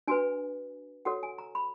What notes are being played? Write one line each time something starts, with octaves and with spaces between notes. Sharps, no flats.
D4 F#4 B4 G#5
F#4 A4 C#5 F#5
G#5
A#5
B5